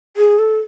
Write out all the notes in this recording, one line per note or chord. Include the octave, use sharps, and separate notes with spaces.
G#4
A4